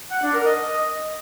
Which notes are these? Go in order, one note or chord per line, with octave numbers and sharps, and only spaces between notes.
F#5
D4
A#4
D#5